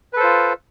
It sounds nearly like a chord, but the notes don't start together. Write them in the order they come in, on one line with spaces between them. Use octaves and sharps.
B4 A4 C5 F4